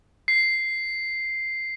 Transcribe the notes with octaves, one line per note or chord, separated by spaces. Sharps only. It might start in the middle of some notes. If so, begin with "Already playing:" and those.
C7